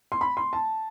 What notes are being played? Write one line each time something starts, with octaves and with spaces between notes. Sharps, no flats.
C6
B5
C6
A5